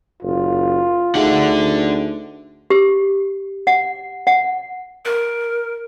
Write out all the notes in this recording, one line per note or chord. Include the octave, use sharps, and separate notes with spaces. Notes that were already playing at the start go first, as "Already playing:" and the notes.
F#1 F4
D2 D4 D#4 G#4 E5 F#5
G4
F#5
F#5
A#4